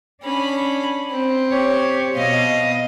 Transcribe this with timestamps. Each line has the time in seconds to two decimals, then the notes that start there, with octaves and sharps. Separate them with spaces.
0.23 C#4 D4 B5
1.11 C4
1.49 G4 C#5
2.14 B2 D#5 F5